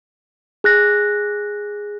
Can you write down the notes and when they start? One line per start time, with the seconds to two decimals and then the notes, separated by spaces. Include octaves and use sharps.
0.64 G#4 F#6 A#6